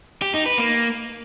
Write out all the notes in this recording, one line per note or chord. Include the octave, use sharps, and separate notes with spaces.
G4
D#4
B4
A#3